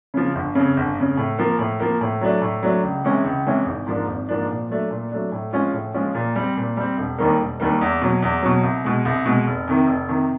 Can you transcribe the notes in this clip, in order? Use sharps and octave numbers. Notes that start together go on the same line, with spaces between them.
C#3 F3
G1
F2 C#3
G1
F2 C#3
A2
F3 A#3
A2
F3 A#3
A2
F#3 A3 D4
A2
F#3 A3 D4
C#2
C3 E3 G#3 C#4
C#2
C3 E3 G#3 C#4
G#1
G#2 F3 A#3 D4
G#1
G#2 F3 A#3 D4
A#2
F#3 A3 D4
A#2
F#3 A3 D4
A2
F3 G#3 C#4 F4
A2
F3 G#3 C#4 F4
A#2
G3 C4
A#2
G3 C4
E1
D#2 D#3 G3 A#3
E1
D#2 D#3 G3 A#3
E2
B2 F#3
E2
B2 F#3
C2
B2 G#3
C2
B2 G#3
F1
F2 C3 D#3
F1
F2 C3 D#3